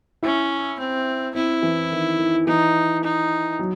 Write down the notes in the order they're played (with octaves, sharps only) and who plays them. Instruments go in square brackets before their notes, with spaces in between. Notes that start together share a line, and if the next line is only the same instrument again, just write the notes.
[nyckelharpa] C#4 [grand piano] E4
[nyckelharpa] C4
[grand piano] C4 [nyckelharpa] E4
[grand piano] E3
D#3
D#3
[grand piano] E3 [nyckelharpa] D#4
[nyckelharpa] D#4
[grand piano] F#3